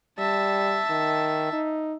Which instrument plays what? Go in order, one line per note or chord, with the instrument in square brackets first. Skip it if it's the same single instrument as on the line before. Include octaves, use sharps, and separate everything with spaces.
[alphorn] G3 [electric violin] E5 A5
[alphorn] D#3
D#4